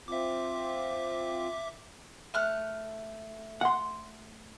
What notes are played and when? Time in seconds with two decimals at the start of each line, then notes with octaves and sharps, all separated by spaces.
0.08 C4 F4 E5 D6
2.34 A3 F6 F#6
3.61 F#5 C6